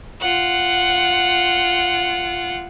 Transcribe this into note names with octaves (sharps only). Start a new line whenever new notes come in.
F4 F#5